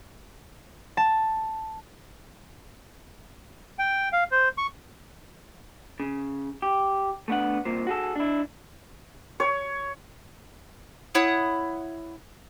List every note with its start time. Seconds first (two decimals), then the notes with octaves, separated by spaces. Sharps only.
0.97 A5
3.79 G5
4.13 F5
4.31 C5
4.58 C#6
6.00 C#3
6.62 G4
7.28 A3 B3 D4 F#5
7.65 C2 A#2 C5
7.87 F#4 G#4 A4
8.16 D4 E4
9.40 C#5
11.15 E4 C#5 F#5 D#6